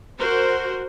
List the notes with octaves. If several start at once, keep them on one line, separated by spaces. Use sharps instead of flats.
F#4 A#4 C5